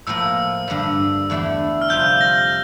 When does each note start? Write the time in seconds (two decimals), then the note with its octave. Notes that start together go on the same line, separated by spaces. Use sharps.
0.07 A2 F3 A#3 E6
0.68 G2 D3 G3
1.30 E2 D3 A3 E4
1.81 F6
1.89 F2 C3 G3 C4 F4 G6
2.21 A#6